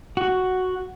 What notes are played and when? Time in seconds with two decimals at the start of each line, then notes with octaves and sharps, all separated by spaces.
0.17 F#4